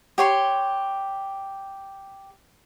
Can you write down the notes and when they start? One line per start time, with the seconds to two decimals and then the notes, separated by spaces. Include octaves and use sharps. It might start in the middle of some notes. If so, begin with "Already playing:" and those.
0.18 G4 C#5 C6